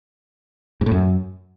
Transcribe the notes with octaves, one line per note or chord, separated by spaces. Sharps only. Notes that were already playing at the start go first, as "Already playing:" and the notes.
G#2
A2
F#2